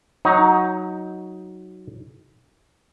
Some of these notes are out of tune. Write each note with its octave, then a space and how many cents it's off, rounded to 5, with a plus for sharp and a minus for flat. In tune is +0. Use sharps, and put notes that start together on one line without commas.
F#3 +0 D#4 +15